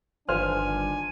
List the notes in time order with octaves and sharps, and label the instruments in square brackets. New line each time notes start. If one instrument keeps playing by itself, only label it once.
[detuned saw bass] G1 [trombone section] D#3 F3 D4 [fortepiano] B4 C5 F6 [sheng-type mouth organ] G#5